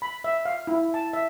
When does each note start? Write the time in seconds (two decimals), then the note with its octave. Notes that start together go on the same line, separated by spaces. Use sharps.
0.02 B5
0.24 E5
0.45 F5
0.67 E4
0.94 A5
1.13 E5